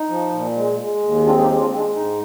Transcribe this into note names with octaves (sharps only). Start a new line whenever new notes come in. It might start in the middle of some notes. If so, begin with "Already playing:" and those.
Already playing: D#4
F3
A#2
G#3
G#3
D#2
C4 D4 F4
G#4
D#4 G4
G#3
D4 F4
G#3
D4
G#2 D#4